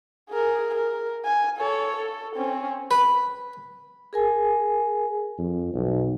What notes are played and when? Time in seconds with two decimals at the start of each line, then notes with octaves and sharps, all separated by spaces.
0.30 G#4 A#4
0.75 A#4
1.25 G#5
1.58 A4 C#5
1.96 A4
2.36 C4 C#4
2.91 B4
4.13 G#4 A#4 G#5
5.38 F2
5.74 B1